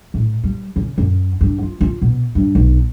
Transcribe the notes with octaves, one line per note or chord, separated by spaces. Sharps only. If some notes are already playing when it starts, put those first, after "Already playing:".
A2
G3
C#3
F#2
G2
F4
F4
B2
G2
B1